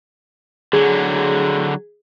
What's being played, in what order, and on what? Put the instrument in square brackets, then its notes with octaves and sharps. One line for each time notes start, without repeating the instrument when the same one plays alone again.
[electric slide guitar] D3 F#3 [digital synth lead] G#4